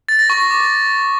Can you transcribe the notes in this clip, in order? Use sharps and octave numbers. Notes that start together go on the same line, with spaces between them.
A6
A#6
C#6
A#6
D6